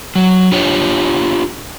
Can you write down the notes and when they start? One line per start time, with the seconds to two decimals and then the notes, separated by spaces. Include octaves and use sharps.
0.15 F#3
0.52 D4 F4 G4 C#5